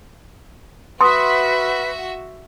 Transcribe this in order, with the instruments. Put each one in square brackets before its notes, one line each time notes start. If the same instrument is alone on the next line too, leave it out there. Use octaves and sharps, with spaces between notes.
[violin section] F#4 E5 [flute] B4 [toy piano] C6 D#6